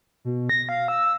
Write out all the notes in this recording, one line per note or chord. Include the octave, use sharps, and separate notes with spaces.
B2
A#6
F5
E6